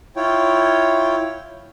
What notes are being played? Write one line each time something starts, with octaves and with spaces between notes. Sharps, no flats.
E4 F4 C#5 G5